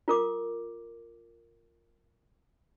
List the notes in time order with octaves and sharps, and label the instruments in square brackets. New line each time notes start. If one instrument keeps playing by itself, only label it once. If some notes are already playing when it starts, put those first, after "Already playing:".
[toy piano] F4 A#4 D6